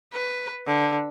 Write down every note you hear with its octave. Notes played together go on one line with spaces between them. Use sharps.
B4
D3